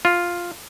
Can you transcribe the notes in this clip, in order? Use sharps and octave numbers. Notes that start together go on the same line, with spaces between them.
F4